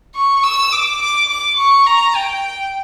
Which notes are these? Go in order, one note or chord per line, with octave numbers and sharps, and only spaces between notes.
C#6
E6
D6
D6
D6
C#6
A#5
G5